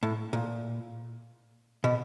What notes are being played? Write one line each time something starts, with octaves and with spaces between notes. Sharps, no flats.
A2
A#2
B2